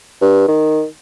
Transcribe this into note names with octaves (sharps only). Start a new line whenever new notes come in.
G2
D#3